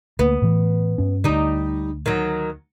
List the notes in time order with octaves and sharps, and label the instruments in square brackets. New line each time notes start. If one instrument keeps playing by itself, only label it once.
[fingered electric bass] D2 A#3 [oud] B3
[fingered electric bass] A2 E3
G2 C#4
[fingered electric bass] D2 D3 [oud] G3 D#4
[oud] D#3 F#3